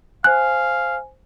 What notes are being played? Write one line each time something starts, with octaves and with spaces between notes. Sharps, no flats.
C5 F5 G#5 F#6